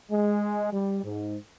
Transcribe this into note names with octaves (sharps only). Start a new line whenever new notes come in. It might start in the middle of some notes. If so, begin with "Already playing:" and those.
G#3
G3
G#2